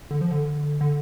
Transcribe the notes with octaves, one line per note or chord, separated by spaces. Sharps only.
D3
F3
D3
D3